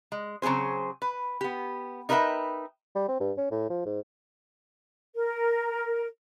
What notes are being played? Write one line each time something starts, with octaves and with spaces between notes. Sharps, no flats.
G#3
C#3 F#3 C4 G#4 C5
B4
B3 G4
D#4 A#4 B4 C#5 E5 G5
G3
C4
G2
C#4
A2
F3
G#2
A#4